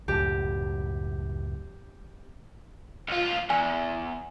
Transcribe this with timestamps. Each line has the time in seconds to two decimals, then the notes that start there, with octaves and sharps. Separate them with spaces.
0.08 C#2 F#2 A2 G4
3.09 B1 F4
3.50 E2 G#5